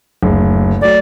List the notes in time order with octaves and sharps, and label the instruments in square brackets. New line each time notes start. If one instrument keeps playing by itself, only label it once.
[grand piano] F#1 D2
[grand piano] F#3 A3 [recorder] D5